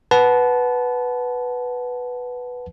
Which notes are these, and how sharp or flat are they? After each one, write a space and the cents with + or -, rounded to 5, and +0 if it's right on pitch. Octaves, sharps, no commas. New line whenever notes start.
B4 +0 F#5 +0 A5 -20